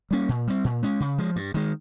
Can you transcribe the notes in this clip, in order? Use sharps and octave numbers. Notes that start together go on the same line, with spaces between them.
G3 A#3 C#4
A#2
G3 C4
A#2
G#3 C#4
C#3
F3 G#3
G2
D#3 G#3